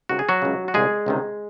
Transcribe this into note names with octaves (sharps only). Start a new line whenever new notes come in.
C#2 C3 D#3 F#4
G#4
F#3 F#4
C#2 C#3
F#4
C2 A#2 G#3 G#4
C#2 C3 D#3